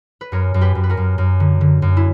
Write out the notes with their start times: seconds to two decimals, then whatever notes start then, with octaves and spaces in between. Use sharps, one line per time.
0.21 B4
0.32 F#2 A#4 C#5
0.54 F#2
0.61 G4 B4
0.75 F#2
0.84 B4
0.89 F#4 A#4
0.97 F#2
1.18 F#2
1.40 D3
1.61 D3
1.82 F#2
1.97 E4